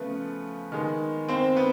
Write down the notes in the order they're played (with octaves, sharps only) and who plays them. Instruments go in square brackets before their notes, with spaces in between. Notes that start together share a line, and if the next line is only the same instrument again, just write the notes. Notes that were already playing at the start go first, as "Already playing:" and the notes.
Already playing: [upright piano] C#3 F3 A3 B3 B4
D#3 G#3 B3
C4 C5
B3 B4